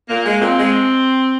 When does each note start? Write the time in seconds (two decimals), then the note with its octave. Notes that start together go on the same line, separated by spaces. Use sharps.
0.08 A#2 A#3
0.24 G#3
0.39 A#2 C4
0.56 G#3